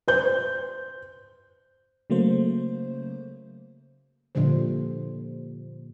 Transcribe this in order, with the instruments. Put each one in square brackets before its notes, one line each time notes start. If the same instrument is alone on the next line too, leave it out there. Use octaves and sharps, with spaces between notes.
[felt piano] C5 G6
[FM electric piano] C#3 F#3 A3 A#3 C5
[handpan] A#2 D3 F3 G3 C5